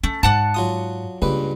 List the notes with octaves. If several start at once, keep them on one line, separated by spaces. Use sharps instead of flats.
A3 C#4
G#2 D5 F#5 A5
F#3 F4 D#6
C#2 G2 A#3 B4